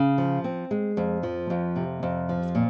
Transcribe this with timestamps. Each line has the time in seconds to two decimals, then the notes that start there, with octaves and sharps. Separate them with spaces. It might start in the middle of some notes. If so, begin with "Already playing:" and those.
Already playing: C#3
0.18 F3
0.44 C4
0.71 G#3
0.97 F2
1.23 F3
1.50 F2
1.76 C3
2.03 F2
2.29 F3
2.55 A#2